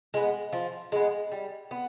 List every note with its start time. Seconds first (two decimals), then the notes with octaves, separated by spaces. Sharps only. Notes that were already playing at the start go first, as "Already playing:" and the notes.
0.14 G#3 B3
0.53 F3
0.92 G#3 B3
1.32 G3
1.71 B3